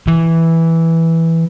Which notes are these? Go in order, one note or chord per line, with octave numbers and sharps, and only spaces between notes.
E3